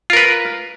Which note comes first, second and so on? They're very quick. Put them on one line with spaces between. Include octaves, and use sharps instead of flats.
F4 A#4 B4